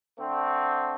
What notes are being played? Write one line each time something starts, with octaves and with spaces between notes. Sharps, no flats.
D3 A3 C4